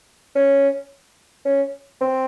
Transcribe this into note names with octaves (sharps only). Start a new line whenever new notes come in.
C#4
C#4
C4